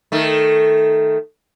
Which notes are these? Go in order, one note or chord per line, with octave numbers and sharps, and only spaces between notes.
D#3 A3